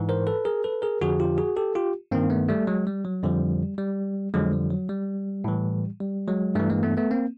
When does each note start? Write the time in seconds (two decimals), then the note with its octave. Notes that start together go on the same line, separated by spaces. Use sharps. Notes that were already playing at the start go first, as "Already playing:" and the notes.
Already playing: G#2 E3
0.09 A#4 C5
0.27 A4 B4
0.45 G#4 A#4
0.64 A4 B4
0.82 G#4 A#4
1.01 F2 D3 F3 F#4 G#4
1.20 F4 G4
1.38 F#4 G#4
1.57 G4 A4
1.75 F4 G4
2.11 G2 D#3 A#3 C4
2.30 A3 B3
2.48 G3 A3
2.67 F#3 G#3
2.87 G3
3.05 F#3
3.23 F2 D3 F3 G3
3.78 G3
4.34 F2 D3 F3 F#3 G#3
4.53 G3
4.71 F#3
4.89 G3
5.44 A2 E3
6.00 G3
6.28 F#3 G#3
6.55 G2 E3 G3 A3
6.70 G#3 A#3
6.83 A3 B3
6.97 A3 B3
7.11 A#3 C4